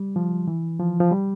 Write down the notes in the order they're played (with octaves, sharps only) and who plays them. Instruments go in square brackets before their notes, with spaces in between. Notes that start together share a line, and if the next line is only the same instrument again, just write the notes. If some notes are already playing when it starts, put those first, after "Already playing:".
Already playing: [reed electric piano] G3
F3
E3
F3
F3
G3